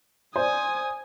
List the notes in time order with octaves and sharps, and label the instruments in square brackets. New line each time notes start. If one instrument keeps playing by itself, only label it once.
[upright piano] C5 D5 [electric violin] G#5 D#6